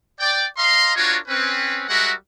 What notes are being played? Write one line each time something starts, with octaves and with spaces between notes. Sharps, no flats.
D5 G5
D#5 F5 A#5 C6
D4 F4 F#4 A#4 C#5
C4 C#4 B4
G3 G#3 F#4 A#4 E5 F#5